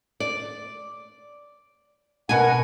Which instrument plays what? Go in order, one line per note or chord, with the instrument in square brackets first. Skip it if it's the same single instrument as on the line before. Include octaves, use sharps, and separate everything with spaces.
[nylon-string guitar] D5
[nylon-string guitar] B2 G#5 [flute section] A#4 F#5